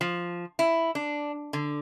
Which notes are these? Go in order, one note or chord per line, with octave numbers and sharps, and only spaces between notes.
F3
E4
D4
D3